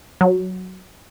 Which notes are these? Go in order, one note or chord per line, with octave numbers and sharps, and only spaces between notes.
F#3